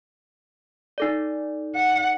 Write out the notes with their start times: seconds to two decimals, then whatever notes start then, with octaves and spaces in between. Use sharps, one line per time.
0.98 D#4 A4 D5
1.75 F#5